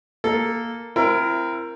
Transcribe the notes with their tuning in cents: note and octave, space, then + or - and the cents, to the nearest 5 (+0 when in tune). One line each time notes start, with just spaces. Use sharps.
A#3 +0 A4 +0
C4 +0 E4 +35 A#4 +0